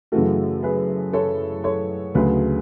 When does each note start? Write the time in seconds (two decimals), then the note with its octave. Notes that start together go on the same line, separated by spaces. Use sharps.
0.12 F#2 C#3 E3 A3 F#4 A4
0.63 G#4 B4
1.13 A4 C#5
1.64 A4 C#5
2.15 D2 C#3 F#3 A3 G#4 B4